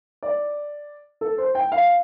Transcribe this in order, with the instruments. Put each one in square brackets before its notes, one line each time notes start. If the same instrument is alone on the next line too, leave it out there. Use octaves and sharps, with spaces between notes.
[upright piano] D5
A4
C5
G5
F5